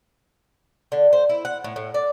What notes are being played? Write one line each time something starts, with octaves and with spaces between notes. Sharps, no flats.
D3
C5
E4
F#5
A2
A2
D5